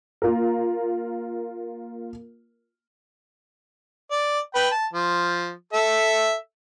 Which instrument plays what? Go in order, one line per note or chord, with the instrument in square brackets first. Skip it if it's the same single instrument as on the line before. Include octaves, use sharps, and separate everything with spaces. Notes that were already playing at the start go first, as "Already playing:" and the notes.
[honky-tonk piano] A#3 F4 A#4
[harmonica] D5
B4 G5 B5
A5
F3
A4 E5